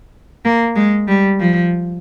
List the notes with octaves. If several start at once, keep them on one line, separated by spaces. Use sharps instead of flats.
A#3
G#3
G3
F3